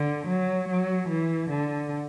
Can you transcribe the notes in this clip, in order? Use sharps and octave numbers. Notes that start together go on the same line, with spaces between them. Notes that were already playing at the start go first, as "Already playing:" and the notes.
Already playing: D3
F#3
F#3
E3
D3